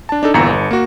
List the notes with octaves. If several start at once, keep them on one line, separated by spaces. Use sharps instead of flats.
D4 A5
D4 D#4 A4
G1 E2 A#2 A#5 C#7
G1
A#3 F#4